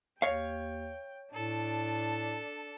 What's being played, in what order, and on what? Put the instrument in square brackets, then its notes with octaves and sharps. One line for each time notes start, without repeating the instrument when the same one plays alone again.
[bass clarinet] D#2 [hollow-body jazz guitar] C#5 F5 [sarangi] G5
[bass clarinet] A2 [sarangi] D4 [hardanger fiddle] A4